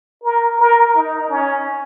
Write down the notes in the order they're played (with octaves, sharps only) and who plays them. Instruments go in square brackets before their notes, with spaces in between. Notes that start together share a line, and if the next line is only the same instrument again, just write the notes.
[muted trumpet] A#4
A#4
D#4
C#4